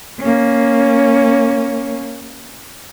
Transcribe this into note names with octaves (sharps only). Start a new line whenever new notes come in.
A#3 C#4